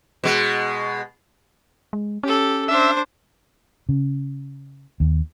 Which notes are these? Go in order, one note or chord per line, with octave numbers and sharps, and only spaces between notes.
B2 G#3
G#3
C#4 G4 A4
D4 C5 E5
C#3
D#2